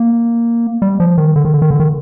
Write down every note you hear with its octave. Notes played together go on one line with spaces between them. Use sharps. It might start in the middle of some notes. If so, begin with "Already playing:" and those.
Already playing: A#3
G3
F3
D#3
D3
D#3
D3
D#3
D3
D#3